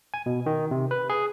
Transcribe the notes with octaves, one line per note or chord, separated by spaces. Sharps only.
G#5
B2
D#3
C3
B4
G#4